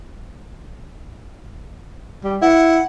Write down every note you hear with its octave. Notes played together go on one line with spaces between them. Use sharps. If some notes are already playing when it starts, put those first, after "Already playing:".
G3
E4 F#5